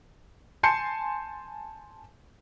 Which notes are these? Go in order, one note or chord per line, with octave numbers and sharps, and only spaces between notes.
G#5 A5 C6 G6 C7 C#7